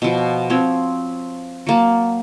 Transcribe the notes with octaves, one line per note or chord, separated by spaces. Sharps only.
B2 F3
F3 C4 C#5
F#3 A#3 A5